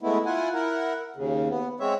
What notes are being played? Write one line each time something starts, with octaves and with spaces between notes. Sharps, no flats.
G#3 A3 B3 E4
E4 F4 F#5 G#5
E4 A#4 F#5
D#2 C#3
B3
G#3 C4 C#5 E5